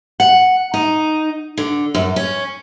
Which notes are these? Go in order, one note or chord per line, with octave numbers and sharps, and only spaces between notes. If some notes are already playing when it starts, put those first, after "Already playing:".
F#5
D#4
D3
F#2
C#4